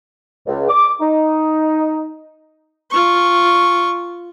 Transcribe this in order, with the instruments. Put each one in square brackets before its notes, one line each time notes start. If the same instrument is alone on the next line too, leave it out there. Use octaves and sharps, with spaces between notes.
[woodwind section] C#2
D6
D#4
[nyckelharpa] F4 C#6